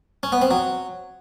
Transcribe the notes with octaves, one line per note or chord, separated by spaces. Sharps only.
C#4
B3
C4
F#3